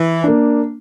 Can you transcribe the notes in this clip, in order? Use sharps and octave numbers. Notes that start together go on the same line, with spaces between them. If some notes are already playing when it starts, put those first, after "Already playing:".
Already playing: E3
A#3 D4